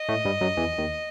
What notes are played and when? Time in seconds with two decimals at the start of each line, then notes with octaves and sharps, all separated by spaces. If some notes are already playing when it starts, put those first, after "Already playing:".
Already playing: D#5
0.09 A2 A3
0.25 G2 G3
0.41 F#2 F#3
0.57 E2 E3
0.78 D#2 D#3